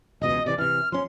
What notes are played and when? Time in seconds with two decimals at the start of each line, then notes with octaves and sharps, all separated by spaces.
0.22 E1 C#2 B2 D#5
0.46 C3 E3 D5
0.58 C3 E3 F6
0.92 F3 C#4 C6